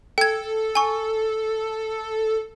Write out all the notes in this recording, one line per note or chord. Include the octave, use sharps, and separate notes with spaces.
A4 G5 G#6
G#5 C#6